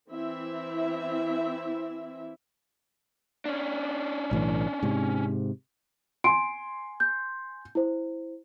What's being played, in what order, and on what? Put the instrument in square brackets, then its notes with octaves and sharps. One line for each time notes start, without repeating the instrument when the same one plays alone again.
[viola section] E3 C4 E4 E5
[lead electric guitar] C#4 D4
[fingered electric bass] B1 A2 E3
G#2 C3
[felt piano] G#5 C6 [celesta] D7
[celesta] G6
E4 C5